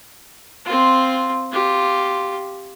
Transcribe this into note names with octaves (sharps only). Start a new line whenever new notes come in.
C4 F4
F4 G4